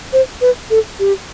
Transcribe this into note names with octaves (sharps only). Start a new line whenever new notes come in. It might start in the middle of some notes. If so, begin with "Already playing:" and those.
C5
B4
A4
G4